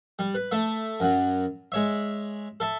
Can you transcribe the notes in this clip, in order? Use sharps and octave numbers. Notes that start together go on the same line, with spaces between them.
G3
B4
A3 E5
F#2 F#3
G#3 C#5 E5
A4 E5